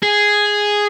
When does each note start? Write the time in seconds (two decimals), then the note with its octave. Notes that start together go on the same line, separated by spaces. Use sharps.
0.03 G#4